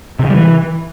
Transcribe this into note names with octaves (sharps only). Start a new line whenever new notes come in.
C3
C#3
G3
E3